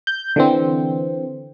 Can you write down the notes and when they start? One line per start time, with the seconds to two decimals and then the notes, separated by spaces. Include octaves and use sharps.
0.07 G6
0.36 D3 E3 C4